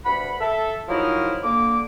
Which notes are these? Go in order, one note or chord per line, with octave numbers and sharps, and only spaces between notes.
D2 G2 F#5 B5
A4 E5
F3 F#3 D#4 E4 A#4 D#5
D3 A#3 D6